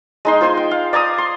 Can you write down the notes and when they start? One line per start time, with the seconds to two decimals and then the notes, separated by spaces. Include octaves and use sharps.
0.25 G#3 D#4 C6
0.41 F4 C5 G#5 C6
0.57 G5
0.71 F5
0.93 D5 G#5 A#5 D#6
1.18 C6